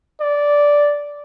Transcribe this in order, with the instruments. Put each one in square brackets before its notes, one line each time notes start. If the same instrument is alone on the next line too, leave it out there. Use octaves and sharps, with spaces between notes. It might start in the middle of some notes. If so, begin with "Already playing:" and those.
[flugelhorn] D5